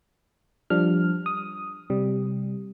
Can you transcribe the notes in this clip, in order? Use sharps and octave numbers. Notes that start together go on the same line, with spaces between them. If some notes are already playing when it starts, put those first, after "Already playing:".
F3 G3 D4 F6
D#6
C3 G3